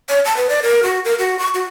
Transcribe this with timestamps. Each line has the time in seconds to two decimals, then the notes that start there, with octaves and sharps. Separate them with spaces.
0.09 C#5
0.25 A5
0.37 B4
0.49 D5
0.63 A#4
0.83 F#4
1.05 A#4
1.19 F#4
1.39 C#6
1.54 F#4